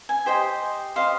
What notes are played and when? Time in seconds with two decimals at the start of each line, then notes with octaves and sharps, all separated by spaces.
0.09 G#5
0.26 G4 C5 D#5 G5
0.95 G4 C5 D#5 F5